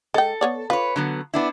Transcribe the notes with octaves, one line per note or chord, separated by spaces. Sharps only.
G#3 A4 G5
B3 C#5 D5
F4 B4 C#5
D3 F#3 B3
B3 D4 E4